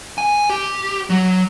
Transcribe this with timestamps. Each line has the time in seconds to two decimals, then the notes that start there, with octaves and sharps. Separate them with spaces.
0.18 G#5
0.50 G4
1.10 F#3